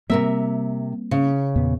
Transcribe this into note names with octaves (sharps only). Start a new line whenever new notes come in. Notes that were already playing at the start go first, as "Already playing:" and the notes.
C3 G3 A#3 C4 A#4 E5
C#3
E2 A#2 B3